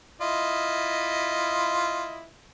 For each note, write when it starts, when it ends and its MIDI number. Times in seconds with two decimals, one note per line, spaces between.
0.21 2.27 64
0.21 2.27 65
0.21 2.27 75